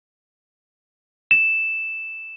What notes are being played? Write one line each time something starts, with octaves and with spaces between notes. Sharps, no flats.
E7